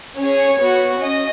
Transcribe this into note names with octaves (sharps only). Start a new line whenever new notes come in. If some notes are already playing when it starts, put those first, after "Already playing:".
C#4 G#4 C#5
B3 F#4
C#4 D#5